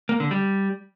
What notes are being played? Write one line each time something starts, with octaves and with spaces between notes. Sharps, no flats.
A#3
D3
G3